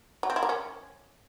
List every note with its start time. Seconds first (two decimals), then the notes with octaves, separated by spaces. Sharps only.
0.23 F#3
0.30 C4
0.36 E4
0.43 A#3
0.49 C#4